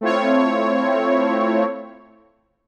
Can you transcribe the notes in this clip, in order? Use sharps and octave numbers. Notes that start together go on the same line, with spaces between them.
A3 C4 E4 F4 C#5